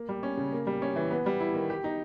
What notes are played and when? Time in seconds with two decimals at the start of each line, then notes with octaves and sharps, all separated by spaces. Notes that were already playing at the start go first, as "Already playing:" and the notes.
Already playing: A#3
0.09 G3
0.23 C#4
0.37 C#3
0.52 A#3
0.67 G3
0.82 C#4
0.96 E3
1.11 B3
1.26 G3
1.40 E4
1.54 D#3
1.70 G4
1.84 D#4